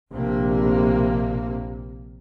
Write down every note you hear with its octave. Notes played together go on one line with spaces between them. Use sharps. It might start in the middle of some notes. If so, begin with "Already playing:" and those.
A#1 C3 A#3